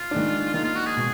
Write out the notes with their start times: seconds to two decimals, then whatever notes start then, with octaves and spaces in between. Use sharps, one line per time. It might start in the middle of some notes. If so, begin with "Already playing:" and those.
Already playing: F4
0.11 D#3 G#3 D4
0.54 D#3 A#3 D#4 F4
0.65 F4
0.75 F#4
0.86 G#4
0.97 B2 G#3